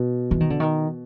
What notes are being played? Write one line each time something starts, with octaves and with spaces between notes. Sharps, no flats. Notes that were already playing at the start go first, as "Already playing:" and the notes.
Already playing: B2
E3
D#3
D3
D#3